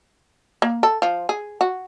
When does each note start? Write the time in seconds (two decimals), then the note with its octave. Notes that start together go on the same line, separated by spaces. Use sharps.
0.62 A#3
0.83 A4
1.02 F3
1.29 G#4
1.61 F#4